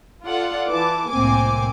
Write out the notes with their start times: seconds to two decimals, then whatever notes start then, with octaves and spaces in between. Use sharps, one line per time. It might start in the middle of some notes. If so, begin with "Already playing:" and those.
0.24 F4 A4 D5 F#5
0.69 E3 A5 D6
1.09 C2 A2 A#3 C4 G#5 D6